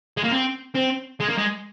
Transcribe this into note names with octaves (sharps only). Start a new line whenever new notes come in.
G#3
A#3
C4
C4
G#3
A#3
G#3